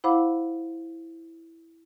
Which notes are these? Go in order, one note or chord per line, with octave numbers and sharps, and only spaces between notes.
E4 C5 F5 F#5 B5 D6